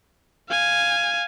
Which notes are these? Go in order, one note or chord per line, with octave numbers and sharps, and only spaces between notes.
F5 G#5